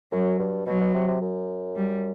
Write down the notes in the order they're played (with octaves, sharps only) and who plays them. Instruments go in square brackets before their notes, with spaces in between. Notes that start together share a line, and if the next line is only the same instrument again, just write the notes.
[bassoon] F#2 [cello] F#3
[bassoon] G2
[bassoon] B2 [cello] F#3
[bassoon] B2
C3
C3
F#2
[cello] G3